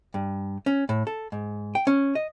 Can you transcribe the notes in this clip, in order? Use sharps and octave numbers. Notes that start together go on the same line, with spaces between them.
G2
C#4
A2
A4
G#2
G5
C#4
D#5